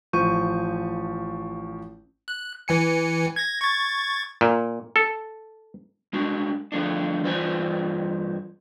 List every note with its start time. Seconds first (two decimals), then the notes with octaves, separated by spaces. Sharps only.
0.13 A1 F3 C#6 G6 D#7
2.28 F#6
2.68 E3 G#5 C#7
3.36 G#6 A#6
3.61 C#6 G#6 A6
4.41 A#2
4.96 A4
6.13 G#3 D4 F#4
6.72 D3 F3 A3 D4
7.23 G2 E3 F4 C5 D5 G#5